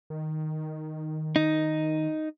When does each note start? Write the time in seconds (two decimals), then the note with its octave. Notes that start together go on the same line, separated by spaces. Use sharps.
0.10 D#3
1.36 D#4